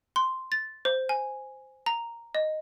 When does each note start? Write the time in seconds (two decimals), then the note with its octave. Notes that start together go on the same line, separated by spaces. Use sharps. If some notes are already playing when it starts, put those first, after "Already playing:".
0.16 C6
0.52 A6
0.85 C5
1.09 G#5
1.86 A#5
2.35 D#5